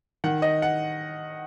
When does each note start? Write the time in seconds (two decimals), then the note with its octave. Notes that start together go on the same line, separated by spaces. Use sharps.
0.24 D#3 F#5
0.42 D#5
0.62 F#5